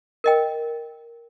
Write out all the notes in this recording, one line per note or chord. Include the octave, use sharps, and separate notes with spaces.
A#4 D#5 G5